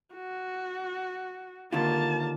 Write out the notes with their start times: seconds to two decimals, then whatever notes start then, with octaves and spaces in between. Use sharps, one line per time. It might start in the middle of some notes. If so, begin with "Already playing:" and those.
0.14 F#4
1.72 D#2 D3 A#3 F4 A5